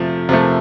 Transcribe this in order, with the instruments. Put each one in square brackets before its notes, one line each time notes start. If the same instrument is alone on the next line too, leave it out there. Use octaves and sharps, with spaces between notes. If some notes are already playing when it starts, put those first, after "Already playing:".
Already playing: [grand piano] C3 F3 A3
C3 F3 A3